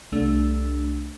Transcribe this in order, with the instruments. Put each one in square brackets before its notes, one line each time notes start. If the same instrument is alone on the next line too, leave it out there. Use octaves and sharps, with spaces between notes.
[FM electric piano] C2 A3 D4 E6